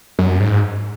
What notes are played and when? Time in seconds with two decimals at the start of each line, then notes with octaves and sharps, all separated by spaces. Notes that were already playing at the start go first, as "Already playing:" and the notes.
0.19 F#2
0.40 G#2